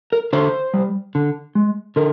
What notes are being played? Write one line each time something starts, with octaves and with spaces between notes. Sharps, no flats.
A#4
D3 C5
G3
D3
G#3
D3 A#4